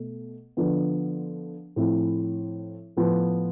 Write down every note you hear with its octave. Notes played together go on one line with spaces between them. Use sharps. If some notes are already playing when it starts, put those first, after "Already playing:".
Already playing: B2 A3
D3 F3 B3
A2 F3 C4 E4
A2 F3 B3